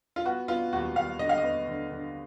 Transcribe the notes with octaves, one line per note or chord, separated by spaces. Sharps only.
F4
B3 F#4
B3 F4
D#2 F#4
D#2 F5
D3 D#5
F5
D#5
B3
D3
D3